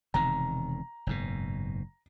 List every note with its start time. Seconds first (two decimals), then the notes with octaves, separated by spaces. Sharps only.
0.14 E1 C3 D#3 A#5
1.07 F#1 G#2 B2